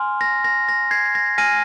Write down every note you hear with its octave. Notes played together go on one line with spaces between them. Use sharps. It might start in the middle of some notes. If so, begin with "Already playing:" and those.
Already playing: G#5 C6 F6
A#6
A#6
A#6
G#6 C7
A#6
G#5 F6 A#6 D#7